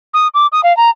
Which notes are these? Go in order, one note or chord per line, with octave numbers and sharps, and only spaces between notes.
D#6
D6
D#6
F5
A#5